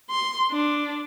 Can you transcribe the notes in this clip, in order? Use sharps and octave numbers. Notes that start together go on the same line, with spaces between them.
C6
D4